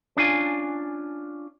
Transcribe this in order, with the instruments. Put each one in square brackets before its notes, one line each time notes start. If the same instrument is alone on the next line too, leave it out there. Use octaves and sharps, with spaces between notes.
[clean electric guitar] C#4 D4 F4 G#5